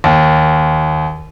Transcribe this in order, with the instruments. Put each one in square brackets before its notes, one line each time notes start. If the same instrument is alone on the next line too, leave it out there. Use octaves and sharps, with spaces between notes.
[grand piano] D#2